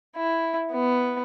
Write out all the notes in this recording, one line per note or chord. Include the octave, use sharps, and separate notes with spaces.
E4
B3